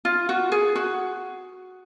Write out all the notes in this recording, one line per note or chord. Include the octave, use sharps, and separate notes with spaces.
F4
F#4
G#4
F#4